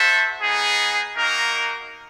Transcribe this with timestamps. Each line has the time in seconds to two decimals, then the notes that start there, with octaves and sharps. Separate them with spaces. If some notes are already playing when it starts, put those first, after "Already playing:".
Already playing: F#4 A4 C5 E5
0.42 B3 D#4 G#4
1.16 A#3 D#4 F#4 A#4